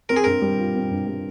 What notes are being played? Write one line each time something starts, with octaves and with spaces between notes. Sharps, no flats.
C4 A#4
G#4
G2 A#4
G3
F4
C4
G2
G3